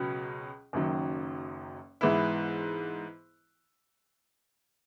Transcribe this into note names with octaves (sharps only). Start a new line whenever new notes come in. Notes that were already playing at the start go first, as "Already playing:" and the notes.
Already playing: C#2 B2 F#3 C#4
F#1 F#2 D#3 F#3
G#2 E3 B3 E4